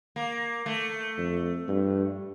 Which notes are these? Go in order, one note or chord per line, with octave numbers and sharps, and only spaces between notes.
A#3
A3
F2
G2